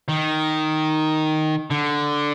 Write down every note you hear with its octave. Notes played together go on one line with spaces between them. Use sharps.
D#3
D3